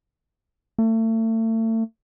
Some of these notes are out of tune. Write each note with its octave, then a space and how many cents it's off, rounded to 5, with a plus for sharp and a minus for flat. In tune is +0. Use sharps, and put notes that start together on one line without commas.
A3 +35